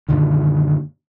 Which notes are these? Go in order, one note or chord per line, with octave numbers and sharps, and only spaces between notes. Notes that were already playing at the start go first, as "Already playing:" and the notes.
F#2 A#2 D3 D#3